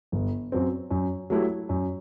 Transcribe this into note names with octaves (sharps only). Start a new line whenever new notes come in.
G1
F#2 F#3 C4
F#2
F#3 A3 E4 G4
F#2